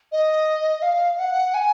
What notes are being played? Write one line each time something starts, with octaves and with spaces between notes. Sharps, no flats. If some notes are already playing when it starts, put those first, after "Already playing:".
D#5
F5
F#5
G#5